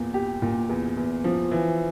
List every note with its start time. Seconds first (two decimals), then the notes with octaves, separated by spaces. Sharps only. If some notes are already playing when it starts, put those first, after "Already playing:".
Already playing: E2 A#2
0.14 G4
0.42 A#2
0.69 E2
0.97 E2
1.24 F3
1.51 E3